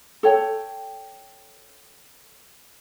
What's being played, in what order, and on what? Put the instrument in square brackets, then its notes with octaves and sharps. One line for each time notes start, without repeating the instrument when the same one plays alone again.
[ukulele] A4 C#5 G5